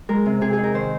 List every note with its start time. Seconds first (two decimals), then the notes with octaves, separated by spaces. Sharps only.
0.09 G#3 A#4
0.26 C3
0.41 C3 G#4
0.53 D#4 G#4
0.63 A#4
0.74 D#3 C5